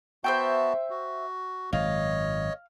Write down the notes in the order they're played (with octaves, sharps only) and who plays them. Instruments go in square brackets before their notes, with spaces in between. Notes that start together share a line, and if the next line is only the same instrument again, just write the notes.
[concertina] B3 F#4 A5 [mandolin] C5 E5 G5
[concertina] F#4
[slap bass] G#1 F#2 [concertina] C#5 D#5 [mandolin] F5